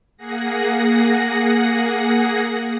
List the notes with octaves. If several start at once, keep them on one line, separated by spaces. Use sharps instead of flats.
A#3 G#4 F#5 A#6